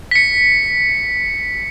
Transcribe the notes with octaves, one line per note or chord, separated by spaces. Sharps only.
B6 C#7